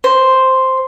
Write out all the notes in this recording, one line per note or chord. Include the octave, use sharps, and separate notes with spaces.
C5